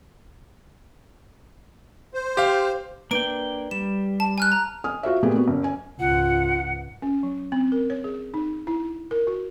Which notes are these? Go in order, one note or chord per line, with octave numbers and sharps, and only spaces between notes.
C5
G4 F5
A#3 D4 B4 G5 D7
G3 E7
A5
G#5 F6 F#6
A#5
G#5 D#6 F6
F4 F#4 C5 E5
A#2 A3 B3 G4 G#4
B3 F#4
F#1
G#5
C#2 G#2 F4 F#5
C#4
F#3
C4
A#4
C#5
G#4
D#4
E4
A#4
F#4